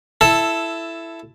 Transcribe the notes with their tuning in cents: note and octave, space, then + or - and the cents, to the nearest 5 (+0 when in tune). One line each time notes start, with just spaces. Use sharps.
E4 +10 A4 +0 A5 +0